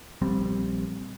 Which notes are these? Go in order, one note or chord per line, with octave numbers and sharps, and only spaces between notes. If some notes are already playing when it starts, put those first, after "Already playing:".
A#1 G3 C4